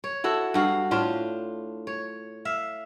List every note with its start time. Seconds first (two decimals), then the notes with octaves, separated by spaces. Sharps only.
0.04 C#5
0.24 E4 F#4 A4 F#5
0.54 G2 F#4 F5
0.91 A2 D4 F4 C5
1.87 C#5
2.45 E5 F5